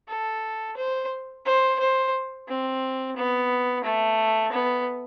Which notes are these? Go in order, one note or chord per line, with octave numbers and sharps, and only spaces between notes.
A4
C5
C5
C5
C4
B3
A3
B3